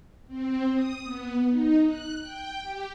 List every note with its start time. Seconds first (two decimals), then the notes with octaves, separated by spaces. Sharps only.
0.27 C4
0.74 D#6
1.04 B3
1.49 D#4
1.86 F#6
2.21 G5
2.62 G4